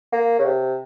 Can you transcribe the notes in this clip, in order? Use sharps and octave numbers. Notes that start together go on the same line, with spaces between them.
A#3
C#3
C3